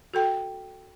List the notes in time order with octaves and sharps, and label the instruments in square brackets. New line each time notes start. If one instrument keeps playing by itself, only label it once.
[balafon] F#4 A4 G5